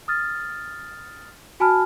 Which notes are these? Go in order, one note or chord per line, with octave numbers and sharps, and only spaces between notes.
D#6 F6 A6
F#4 G#5 A5 B5 F6